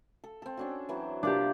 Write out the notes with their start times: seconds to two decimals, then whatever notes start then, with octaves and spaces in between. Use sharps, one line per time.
0.24 A4
0.42 C4 A4
0.57 C#4 D4 F#4
0.89 E3 F#3 C4
1.23 C3 A#3 D4 F4 G4